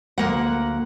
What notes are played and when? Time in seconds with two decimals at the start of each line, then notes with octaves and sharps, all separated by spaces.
0.18 D2 A#3 F#5